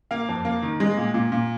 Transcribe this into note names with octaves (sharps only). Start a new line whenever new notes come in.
A#3 F5
F2
A#3
D#3
G#3
A#2
A#2
A#2